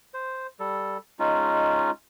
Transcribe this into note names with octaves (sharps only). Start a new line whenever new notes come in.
C5
G3 A4
G#3 C#4 D#4 F4